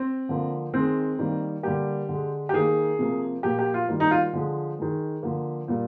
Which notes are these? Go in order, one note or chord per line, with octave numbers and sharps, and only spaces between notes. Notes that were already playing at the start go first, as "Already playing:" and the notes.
Already playing: C4
D3 F3 A#3
D#3 G#3 C4
D#3 G3 A#3
D3 G3 A#3 G4
D3 G#3
G4
D#3 A#3 G#4
C3 F3 A#3
A#2 F3 A#3 G4
G4
F4
D#3 G3 A#3
D#4
F4
D3 F3 G#3
D#3 G#3
D3 F3 A#3
A#2 G3 A#3